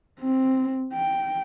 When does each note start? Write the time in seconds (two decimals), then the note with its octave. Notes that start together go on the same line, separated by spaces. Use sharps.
0.20 C4
0.93 G5